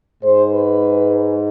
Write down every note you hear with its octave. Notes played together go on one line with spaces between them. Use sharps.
G#2 G#3 C5
B4